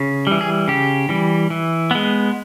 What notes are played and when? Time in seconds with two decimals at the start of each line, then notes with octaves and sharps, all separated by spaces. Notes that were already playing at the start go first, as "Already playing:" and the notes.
Already playing: C#3
0.27 E3 G3
0.41 G#4
0.68 C#3 G4
1.09 E3 G3
1.50 E3
1.91 G#3 B3